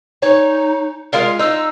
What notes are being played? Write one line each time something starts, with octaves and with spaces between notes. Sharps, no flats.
D#4 C#5 G#5
G#3 F4 A#4 F5
D#4 E6